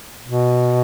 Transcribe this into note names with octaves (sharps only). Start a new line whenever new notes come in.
B2